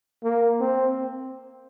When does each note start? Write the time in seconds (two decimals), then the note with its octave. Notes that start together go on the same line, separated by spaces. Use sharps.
0.24 A#3
0.61 C4